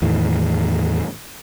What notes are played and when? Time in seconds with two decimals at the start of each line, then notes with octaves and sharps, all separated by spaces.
0.02 E2 A2 D#3